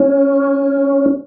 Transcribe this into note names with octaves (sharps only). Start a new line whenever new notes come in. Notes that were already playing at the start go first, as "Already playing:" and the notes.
Already playing: C#4